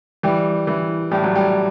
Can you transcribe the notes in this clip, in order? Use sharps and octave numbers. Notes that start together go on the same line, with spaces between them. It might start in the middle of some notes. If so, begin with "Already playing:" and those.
E3 G3
E3
A2 G3
F#3
G3